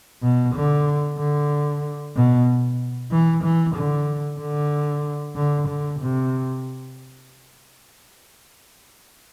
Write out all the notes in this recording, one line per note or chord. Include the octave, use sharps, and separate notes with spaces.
B2
D3
D3
B2
E3
E3
D3
D3
D3
D3
C3